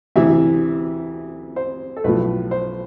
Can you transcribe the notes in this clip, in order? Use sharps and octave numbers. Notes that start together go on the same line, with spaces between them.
D2 C3 E3 E5
C5
A4
B1 A2 F3 B4
C5